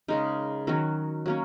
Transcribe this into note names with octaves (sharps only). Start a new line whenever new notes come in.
C#3 G#3 D#4 A#4
D#3 F#3 C#4 F#4
F#3 A#3 C#4